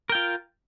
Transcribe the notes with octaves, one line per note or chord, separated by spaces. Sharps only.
F4 A#4 G5